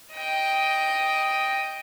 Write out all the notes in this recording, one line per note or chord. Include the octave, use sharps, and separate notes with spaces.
D#5 G5